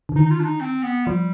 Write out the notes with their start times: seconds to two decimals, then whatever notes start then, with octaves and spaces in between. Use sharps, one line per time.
0.09 D3
0.16 D#3 D#4
0.26 D#4
0.31 F4
0.40 D4
0.45 D#4
0.61 C4
0.83 B3
1.06 F3 G3